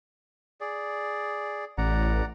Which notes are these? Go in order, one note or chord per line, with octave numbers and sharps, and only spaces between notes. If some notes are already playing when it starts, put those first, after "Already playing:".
G#4 D5
A1 D5 F#5 A#5